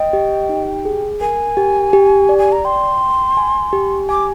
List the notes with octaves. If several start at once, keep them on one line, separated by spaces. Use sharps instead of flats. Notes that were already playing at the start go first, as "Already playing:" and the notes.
Already playing: D#5 G5
G4
D#4
G#4
A#4 G#5
G4
G4
D5
G#5
A#5
G5 C6
G5
G#5
G4
G#5 D6